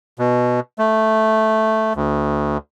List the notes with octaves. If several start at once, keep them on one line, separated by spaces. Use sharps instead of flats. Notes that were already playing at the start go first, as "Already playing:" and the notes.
B2
A3
D2